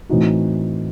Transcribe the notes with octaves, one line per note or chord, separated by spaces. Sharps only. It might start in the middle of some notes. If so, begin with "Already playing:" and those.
A2 E3 C4 D#4 F#4